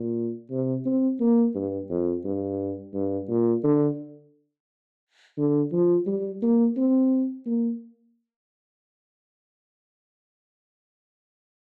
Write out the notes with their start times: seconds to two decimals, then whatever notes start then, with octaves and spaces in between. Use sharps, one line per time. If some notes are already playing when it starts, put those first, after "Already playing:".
Already playing: A#2
0.51 C3
0.85 C4
1.20 A#3
1.55 G2
1.90 F2
2.24 G2
2.94 G2
3.29 A#2
3.63 D3
5.38 D3
5.72 F3
6.06 G3
6.42 A#3
6.76 C4
7.46 A#3